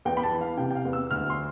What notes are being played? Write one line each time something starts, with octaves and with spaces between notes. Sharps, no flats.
E2 G5
B5
A5
E3
F5
C3 G5
G5
F5
E2
E6
D2 F6
C6